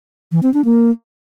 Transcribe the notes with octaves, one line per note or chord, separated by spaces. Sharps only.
E3
C4
D4
A#3